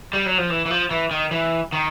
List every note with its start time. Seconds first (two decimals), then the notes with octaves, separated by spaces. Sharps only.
0.13 G3
0.26 F#3
0.38 F3
0.50 E3
0.66 E3
0.71 F3
0.91 E3
1.11 D#3
1.31 E3
1.73 D#3